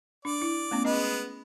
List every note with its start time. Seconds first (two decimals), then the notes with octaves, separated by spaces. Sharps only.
0.25 D4 D5
0.42 E4
0.71 A3 B3 C#4
0.85 G#3 B3 C#4 D#5